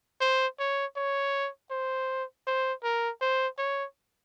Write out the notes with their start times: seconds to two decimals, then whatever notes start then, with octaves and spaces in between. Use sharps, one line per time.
0.21 C5
0.59 C#5
0.96 C#5
1.71 C5
2.47 C5
2.83 A#4
3.21 C5
3.58 C#5